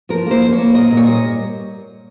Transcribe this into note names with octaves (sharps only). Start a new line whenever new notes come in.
F3 A#4
A#3 C5
F2
C#5
A#3
A#2 D#5
A#2
C#5
G3 D#5
A#2